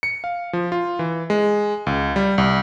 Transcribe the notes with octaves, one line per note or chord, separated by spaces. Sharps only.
C#7
F5
F3
F4
E3
G#3
C#2
G3
C2